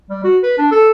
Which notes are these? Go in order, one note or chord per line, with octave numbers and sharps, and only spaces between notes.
G3
F#4
B4
D4
A4